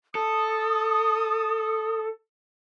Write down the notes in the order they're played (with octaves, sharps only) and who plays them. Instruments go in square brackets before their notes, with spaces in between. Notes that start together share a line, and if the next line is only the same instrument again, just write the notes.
[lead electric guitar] A4 [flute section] D#6